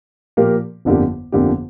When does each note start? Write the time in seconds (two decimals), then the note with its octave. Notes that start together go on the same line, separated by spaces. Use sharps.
0.37 A#2 F3 A#3 G4 A#4
0.85 G1 F2 D3 A#3 G4
1.32 G1 F2 D3 A#3 G4